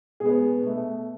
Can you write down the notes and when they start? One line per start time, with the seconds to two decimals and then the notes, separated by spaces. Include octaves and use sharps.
0.20 B2 G#3 B3 G#4
0.62 B2 A3